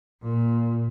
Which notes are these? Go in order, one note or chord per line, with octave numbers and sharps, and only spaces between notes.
A#2